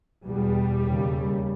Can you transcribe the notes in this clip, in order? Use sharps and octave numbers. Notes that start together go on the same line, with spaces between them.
E2 B2 G3
D#2 C#3